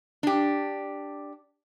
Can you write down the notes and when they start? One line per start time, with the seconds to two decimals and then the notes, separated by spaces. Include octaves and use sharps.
0.23 D4 G4